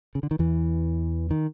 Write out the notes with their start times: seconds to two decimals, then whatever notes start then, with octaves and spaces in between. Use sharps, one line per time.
0.15 C#3
0.23 D3
0.31 D#3
0.39 E2 E3
1.31 D#3